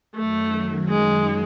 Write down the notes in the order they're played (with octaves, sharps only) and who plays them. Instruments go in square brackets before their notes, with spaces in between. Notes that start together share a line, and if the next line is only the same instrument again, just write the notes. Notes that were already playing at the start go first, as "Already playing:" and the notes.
[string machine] F#2 D#3 F#3 [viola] A3
[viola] G#3